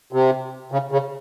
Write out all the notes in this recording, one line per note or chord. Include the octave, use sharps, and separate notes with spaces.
C3
C#3
C#3